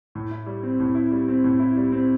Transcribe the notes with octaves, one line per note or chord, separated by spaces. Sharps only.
A2
E4
G3
C4
A2
E4
G3
C4
A2
E4
G3
C4